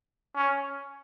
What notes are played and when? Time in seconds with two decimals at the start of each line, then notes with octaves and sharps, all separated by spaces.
0.36 C#4